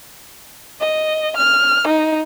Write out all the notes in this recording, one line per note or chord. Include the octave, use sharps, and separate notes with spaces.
D#5
F6
D#4